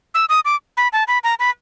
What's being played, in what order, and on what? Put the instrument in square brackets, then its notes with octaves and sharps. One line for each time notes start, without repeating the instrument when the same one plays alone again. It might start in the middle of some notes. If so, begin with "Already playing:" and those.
[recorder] E6
D#6
D6
B5
A5
B5
A#5
B5